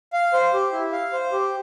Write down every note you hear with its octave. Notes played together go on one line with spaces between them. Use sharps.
F5
C5
G4
E4
F5
C5
G4